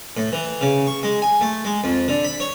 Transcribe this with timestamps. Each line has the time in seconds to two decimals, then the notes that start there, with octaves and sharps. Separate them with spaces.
0.17 A2
0.32 E3
0.61 C#3
0.87 C#6
1.03 G#3
1.22 G#5
1.41 A3
1.65 G#3
1.84 F2
2.08 D3
2.25 B5
2.40 C#5